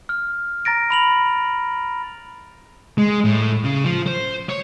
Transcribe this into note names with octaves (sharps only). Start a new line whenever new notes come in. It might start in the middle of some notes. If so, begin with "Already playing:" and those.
F6
A#5 A6 A#6 D7
B5 F7 F#7
G#3
A2
C#3
F3
C5
C#5